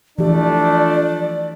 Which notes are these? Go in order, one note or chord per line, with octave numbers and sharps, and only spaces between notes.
E3 F3 A3 D4 G4 D5